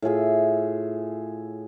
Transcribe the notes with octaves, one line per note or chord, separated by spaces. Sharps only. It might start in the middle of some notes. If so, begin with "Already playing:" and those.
A2 F4 G#4 E5